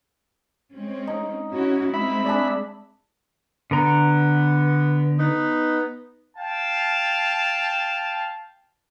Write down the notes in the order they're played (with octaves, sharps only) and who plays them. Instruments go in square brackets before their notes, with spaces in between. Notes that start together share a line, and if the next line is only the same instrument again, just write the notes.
[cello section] G#3 C4 C#4
[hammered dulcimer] D#4
[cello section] C#4 E4 F#4
[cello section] G#3 C4 [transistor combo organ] E5 B5
[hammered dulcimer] D4 G#4 D5
[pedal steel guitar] D3 A#5 [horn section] B3
[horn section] B3 D#4
[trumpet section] F5 G5 A5